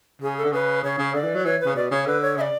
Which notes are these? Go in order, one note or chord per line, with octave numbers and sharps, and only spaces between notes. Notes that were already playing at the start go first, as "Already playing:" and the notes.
C#3 G#4
A4
D3
C#3 B4
C#3 C#5
C#3
D3 D5
E3
F#3
E3 C#5
B4
C#3
B2 D5
C#3 C#5
D3 B4
C#5
C#3 D5 E5